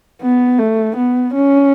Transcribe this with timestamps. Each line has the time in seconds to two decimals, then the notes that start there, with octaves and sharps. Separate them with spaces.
0.22 B3
0.59 A3
0.97 B3
1.34 C#4